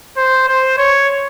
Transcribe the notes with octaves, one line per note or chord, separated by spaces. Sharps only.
C5
C5
C#5